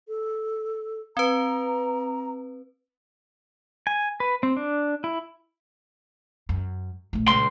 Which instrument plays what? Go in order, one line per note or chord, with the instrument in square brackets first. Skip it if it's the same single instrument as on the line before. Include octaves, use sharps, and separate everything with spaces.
[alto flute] A4
[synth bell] C4 B4 [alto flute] A#5
[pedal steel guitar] G#5
B4
C4
D4
E4
[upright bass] F#2
A#1 A3
[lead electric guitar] C#2 C6 [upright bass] A#2